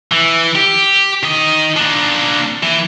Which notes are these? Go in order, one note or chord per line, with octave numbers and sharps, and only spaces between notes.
E3
G4
D#3 D#5
A#3 D4
E3